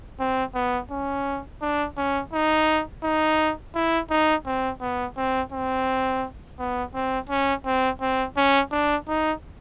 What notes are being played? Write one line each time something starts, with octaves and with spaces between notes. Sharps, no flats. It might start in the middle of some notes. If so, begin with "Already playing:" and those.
C4
B3
C#4
D4
C#4
D#4
D#4
E4
D#4
C4
B3
C4
C4
B3
C4
C#4
C4
C4
C#4
D4
D#4